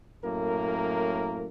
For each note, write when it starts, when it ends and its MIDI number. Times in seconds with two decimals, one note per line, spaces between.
0.24 1.47 42
0.24 1.47 45
0.24 1.47 58
0.24 1.47 70